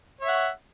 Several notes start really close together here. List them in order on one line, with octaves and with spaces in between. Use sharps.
C#5 E5 F#5